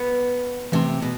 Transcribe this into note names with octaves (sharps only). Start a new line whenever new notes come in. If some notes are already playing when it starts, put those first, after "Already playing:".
Already playing: B3
C3 E3 A3 C4
B2